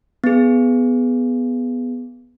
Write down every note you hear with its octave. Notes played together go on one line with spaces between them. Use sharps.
B3 G#4